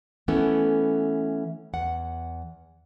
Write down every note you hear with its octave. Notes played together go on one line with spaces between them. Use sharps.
E3 A3 B3 C#4 E4 A4
E2 F#5